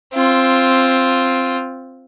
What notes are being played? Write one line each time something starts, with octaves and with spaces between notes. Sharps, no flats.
C4 F4